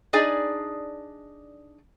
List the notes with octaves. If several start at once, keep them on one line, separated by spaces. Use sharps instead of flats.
D4 D#4 G#4 D5 G#5